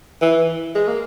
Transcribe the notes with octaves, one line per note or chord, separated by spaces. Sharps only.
E3
G#3
A#3